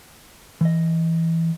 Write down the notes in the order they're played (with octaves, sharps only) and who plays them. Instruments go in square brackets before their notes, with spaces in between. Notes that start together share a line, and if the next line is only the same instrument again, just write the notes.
[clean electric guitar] E3 D#5